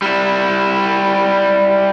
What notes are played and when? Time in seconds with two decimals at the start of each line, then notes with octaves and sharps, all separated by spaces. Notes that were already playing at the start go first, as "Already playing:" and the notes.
0.02 G3 E4